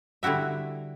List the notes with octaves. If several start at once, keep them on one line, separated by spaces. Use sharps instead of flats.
D3 G3 E4 F#4 E5